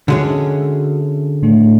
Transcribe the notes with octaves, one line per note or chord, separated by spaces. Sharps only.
D3 G#3 C#4 F#4 E5
A2 A3 D4